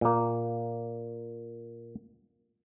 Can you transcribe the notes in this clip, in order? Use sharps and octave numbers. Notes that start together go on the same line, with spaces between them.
A#2 A#3